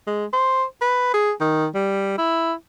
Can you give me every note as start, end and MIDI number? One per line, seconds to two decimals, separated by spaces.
0.07 0.25 56
0.33 0.63 72
0.82 1.12 71
1.14 1.31 68
1.41 1.66 51
1.75 2.15 55
2.18 2.53 64